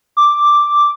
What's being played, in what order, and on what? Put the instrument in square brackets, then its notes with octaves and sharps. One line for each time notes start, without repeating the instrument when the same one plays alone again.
[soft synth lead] D6